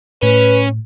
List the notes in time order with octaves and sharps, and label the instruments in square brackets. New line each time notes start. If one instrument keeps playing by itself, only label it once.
[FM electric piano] A2 [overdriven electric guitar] C#4 [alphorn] B4